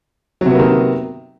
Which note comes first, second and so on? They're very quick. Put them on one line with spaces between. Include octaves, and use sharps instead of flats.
F#3 C3 B3 A#3 D#3